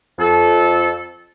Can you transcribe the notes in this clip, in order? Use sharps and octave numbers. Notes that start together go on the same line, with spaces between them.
F2 A4